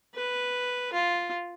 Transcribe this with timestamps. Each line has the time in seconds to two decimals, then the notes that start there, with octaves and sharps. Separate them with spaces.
0.15 B4
0.93 F4